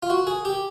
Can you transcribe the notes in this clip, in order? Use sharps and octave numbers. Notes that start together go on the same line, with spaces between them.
F4
F#4
G#4
G4